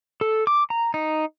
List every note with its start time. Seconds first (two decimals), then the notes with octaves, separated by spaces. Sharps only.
0.21 A4
0.47 D6
0.70 A#5
0.94 D#4